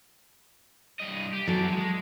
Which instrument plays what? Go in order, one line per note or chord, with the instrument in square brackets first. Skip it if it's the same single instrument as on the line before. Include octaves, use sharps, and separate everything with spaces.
[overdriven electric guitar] G2 D#5
G4
[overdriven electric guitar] E3 D5 [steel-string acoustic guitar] F#3 A4
[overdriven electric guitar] G#3